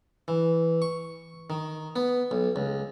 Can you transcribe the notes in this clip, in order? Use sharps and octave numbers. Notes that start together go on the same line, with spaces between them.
E3
C#6
D#3
B3
B1
C#2